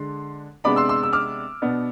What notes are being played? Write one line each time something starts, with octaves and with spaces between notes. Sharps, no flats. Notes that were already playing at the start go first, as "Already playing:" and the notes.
Already playing: D3 G#3 D4 C6
C3 G#3 B3 D4 B5 D6
C6 E6
C6 E6
E6
D6 F6
B2 B3 D4